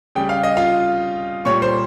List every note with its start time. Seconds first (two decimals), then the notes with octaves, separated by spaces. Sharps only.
0.15 C#3 G3 G5
0.29 F5
0.43 D#5
0.57 F4 F5
1.45 A#2 G3 C#5 C#6
1.62 C5 C6